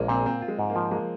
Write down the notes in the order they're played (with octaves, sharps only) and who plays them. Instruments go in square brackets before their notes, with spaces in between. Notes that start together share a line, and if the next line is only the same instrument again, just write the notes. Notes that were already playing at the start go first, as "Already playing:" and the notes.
Already playing: [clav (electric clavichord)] A#1 [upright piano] G#3 A#3
[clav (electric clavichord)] A#2 [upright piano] C4
[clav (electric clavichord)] A#3 [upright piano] C4
[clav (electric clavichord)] F4
[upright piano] G#3
[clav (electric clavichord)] G#2
[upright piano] A#3
[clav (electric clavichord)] F3
[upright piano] G#3 [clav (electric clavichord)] A#3